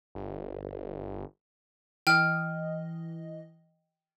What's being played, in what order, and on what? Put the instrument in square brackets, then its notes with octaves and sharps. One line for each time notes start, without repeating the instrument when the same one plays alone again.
[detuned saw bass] G1
[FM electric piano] E3 D#5 [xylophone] G5 F6